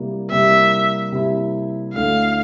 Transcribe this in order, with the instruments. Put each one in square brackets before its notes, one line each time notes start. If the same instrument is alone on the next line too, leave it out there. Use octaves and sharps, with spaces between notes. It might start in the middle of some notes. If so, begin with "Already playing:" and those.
Already playing: [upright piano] C3 G3 A#3 E4
[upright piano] C3 G3 A#3 E4 [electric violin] E5
[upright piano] C3 G3 A#3 E4
[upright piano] D2 D3 A3 E4 [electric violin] F5